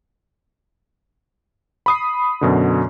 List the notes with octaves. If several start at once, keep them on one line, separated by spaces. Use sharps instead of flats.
B5 D#6 C7
F#2 B2 D3